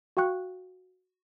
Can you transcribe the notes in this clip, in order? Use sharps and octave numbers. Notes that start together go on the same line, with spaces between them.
F#4 F5 G5 C#6 F#6